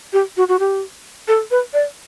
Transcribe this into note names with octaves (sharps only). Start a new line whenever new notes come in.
G4
F#4
F#4
G4
A4
B4
D5